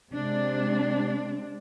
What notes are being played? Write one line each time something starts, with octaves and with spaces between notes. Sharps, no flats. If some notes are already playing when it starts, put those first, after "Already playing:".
C3 G#3 C4 D4